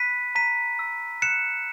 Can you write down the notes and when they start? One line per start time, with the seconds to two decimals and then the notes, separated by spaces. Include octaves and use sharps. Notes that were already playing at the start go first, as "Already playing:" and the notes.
Already playing: B5 F#6 B6 D#7
0.35 A#5 B6 D#7
0.79 E6
1.22 F#6 C#7 E7